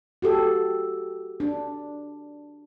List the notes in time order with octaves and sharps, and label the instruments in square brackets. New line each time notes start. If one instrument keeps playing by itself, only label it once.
[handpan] F#4 G4 A4
D4